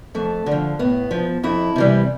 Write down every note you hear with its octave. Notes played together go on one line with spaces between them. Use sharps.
F2 A3
D3
F3
A2 B3
F3
F2 E4
C3 E3 G3